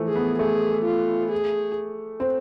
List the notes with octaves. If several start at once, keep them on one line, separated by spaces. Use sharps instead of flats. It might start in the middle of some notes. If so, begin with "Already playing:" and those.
Already playing: E3 F3 A3
G#4
B3
A3 G#4
F4
G#4
C4